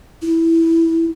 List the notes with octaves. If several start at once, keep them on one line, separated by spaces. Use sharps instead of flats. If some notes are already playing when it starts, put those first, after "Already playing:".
E4